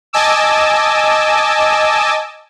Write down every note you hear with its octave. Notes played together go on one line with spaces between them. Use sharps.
D#5 G#5 A5 D6 E6